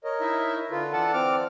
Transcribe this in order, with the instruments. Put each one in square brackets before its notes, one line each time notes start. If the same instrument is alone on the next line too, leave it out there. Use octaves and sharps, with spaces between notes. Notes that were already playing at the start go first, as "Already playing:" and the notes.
[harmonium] A#4 C#5 D#5
[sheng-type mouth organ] D#4 E4 E5
[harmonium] D3 A4 B4 [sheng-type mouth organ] F4
[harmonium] E3 D5 [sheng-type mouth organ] A4 F#5 A5
[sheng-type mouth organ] C4 D6 F6